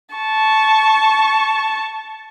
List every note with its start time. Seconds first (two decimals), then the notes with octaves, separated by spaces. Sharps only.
0.15 A5 C#6